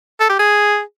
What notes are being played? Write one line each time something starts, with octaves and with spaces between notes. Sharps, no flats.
A4
G4
G#4